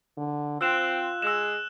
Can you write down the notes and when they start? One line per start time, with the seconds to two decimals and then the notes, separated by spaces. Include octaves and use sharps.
0.17 D3
0.61 C4 F4 E6 F#6 E7
1.22 G#3 E6 E7